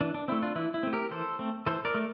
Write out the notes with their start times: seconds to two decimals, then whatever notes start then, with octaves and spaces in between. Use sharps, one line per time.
0.01 E3 D4
0.14 D4
0.28 A3 C4 E4
0.42 D4 F4
0.56 E3 E4
0.74 E4
0.83 A3 C4
0.93 G4 A#4
1.11 E3 A4 C5
1.39 A3 C4
1.66 E3 A4 C5
1.85 A#4 D5
1.94 A3